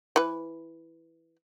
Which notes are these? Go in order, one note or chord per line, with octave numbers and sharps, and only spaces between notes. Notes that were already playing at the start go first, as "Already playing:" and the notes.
E3 B4